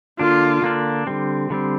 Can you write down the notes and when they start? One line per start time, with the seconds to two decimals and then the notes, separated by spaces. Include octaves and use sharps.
0.19 D3 A#3 D4 F4
0.62 D3 A#3 D4
1.07 D3 G3 C4
1.50 D3 G3 C4